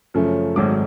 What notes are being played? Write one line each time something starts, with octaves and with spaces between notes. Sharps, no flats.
F#2 C#3 F3 A3
G#1 G#2 F#3 A3 D6